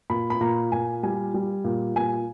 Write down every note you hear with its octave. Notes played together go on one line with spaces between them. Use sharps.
A#2 B5
B5
A#2 A#5
A#2 G#5
G3 G#5
G3
A#2
A#2 G#5